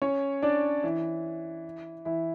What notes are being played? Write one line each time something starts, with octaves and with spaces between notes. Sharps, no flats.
C#4 C#5
D4 D5
E3 E4
E3 E4